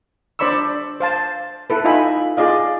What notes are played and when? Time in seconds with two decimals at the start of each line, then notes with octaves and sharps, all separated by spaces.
0.39 D4 C5 D5 B5 C#6 E6
1.00 C5 F5 A5
1.70 E4 A4 B4
1.85 D#4 F4 D#5 E5 G#5 B5
2.37 F4 G#4 D5 D#5 F5